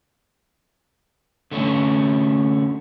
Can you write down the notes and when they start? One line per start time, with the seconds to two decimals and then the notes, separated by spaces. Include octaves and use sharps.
1.51 D3 A3 C#4